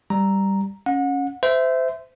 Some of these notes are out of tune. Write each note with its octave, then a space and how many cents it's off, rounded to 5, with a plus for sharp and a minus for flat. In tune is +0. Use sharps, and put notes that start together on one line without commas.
G3 +0 A#5 +0
C#4 +0 F#5 -30
C5 -25 E5 +0